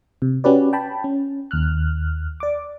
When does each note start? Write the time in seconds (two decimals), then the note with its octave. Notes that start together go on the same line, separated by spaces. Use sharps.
0.22 C3
0.44 C#4 F#4 G4 B4 D5
0.73 G5 A5 B5
1.04 C#4
1.51 D#2 F6 F#6
2.40 D5 D6